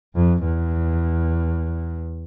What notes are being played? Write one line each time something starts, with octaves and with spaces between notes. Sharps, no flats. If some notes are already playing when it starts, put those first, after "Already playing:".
F2
E2